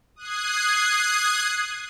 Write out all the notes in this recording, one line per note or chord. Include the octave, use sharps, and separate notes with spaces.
D#6 F#6 G#6 C7